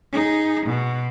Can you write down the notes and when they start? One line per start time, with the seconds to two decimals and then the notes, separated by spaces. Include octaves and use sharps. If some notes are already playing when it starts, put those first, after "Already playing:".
0.13 D#4 G#4
0.66 B2